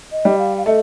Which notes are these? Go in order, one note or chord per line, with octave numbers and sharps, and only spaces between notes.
D#5
G3
F5
F5
A3 D#5